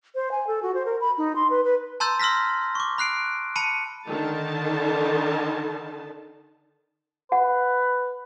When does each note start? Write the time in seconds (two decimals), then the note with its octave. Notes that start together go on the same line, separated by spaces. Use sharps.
0.15 C5
0.31 G#5
0.47 A4
0.63 F#4
0.74 C5
0.86 A#4
1.01 B5
1.18 D#4
1.36 C6
1.50 B4
1.64 B4
2.00 A5 A#5 C6 E6 G6 A6
2.20 C6 E6 F6 A#6 B6
2.75 C#6 D6
2.98 B5 F#6 C7 D7
3.56 A5 B5 C#7 D#7
4.07 D3 D#3 A5
7.32 B4 F#5